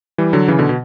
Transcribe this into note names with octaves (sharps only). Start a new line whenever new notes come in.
E3 G3
D3 F#3
C#3 E3
B2 D3
B2